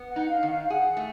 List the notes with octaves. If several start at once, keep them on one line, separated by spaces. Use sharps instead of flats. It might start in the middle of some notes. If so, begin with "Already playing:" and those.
Already playing: B3
F#5
D#4
F5
D#3
F5
F5
G#4 F#5
A3